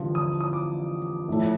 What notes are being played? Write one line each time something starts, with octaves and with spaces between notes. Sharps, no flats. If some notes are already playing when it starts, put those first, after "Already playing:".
Already playing: A1 G2 D3 F3
D#6
D#6
D6
A#1 A2 A3